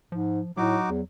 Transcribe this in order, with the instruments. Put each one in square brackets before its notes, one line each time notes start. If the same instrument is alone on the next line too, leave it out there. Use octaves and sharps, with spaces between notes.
[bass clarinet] G#2 [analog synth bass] F3
[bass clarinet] A2 [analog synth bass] F#3 [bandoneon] D#4 F#4 D6
[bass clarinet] E2